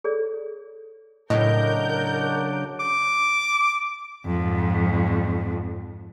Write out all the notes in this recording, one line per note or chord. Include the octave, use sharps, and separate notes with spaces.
G#4 A4 C#5 D5
A2 C#3 F#3 D4 A#4 D#5 G6
D6
F2 G#2